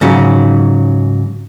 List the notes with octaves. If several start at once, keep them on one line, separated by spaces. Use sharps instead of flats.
G#2 C#3 F#3